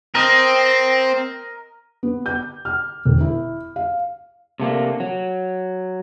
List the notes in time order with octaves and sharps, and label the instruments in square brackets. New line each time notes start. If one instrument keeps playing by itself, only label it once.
[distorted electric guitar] C4 [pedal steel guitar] A#4 D#5
[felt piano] B3
G6
F6
E1
E4
F5
[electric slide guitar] C3 A3 A#3 D4
F#3